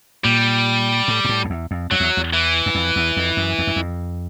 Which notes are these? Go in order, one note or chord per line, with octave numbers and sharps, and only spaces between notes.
A#2 G3
A2
G#2
A2
F2
E2
F2
F2 F#3
E2
E2
E3
F#2
F2
E2
F2
F#2
F2
F#2
F2